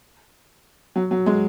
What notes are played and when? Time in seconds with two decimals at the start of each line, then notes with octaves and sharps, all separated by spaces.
0.96 F#3
1.11 F#3
1.26 G#3